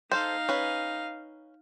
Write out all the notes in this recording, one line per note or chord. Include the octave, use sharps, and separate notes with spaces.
D#4 A4 C5 F5
C#4 B4